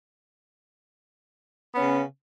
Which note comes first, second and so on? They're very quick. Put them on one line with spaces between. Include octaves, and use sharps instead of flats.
B3 C#4 C#3